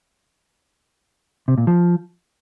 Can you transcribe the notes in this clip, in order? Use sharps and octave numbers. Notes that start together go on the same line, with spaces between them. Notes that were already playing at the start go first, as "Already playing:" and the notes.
C3
A#2
F3